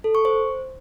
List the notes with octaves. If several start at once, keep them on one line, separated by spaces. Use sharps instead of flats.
A4
C#6
C5